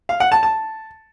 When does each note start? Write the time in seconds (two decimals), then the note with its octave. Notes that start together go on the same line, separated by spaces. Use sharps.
0.09 F5
0.20 F#5
0.32 A5
0.43 A5